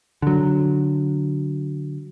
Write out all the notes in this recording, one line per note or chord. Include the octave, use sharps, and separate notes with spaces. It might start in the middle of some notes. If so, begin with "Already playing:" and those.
D3 F#3